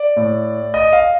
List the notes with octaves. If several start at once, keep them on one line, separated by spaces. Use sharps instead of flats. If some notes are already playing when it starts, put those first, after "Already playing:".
Already playing: D5
A2
D#5
F5